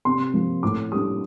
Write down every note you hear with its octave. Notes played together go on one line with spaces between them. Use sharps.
C3 C6
F3 A#3
A2 D6
G3 A#3 D4 D#6